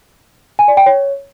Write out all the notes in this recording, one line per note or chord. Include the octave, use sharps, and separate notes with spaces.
G#5
D5
G5
C#5